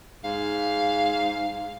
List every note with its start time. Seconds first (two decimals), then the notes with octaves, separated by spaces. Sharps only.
0.24 G#2 F5